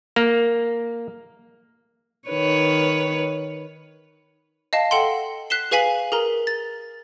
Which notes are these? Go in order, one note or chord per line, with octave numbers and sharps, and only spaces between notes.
A#3
D#3 B4 C#5
D#5 F5 A5
A4 F#5 G5 C6
F#6 B6 C7 E7 G7
G#4 B4 F5 G#5 B6 F#7
G#4 A#4 A#5
A6